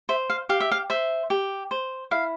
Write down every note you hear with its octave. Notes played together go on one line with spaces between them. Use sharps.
C5 E5
F5
G4 F5
E5
F5
C5 E5
G4
C5
E4 F5